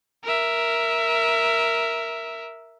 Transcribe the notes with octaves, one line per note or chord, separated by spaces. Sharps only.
A#4 E5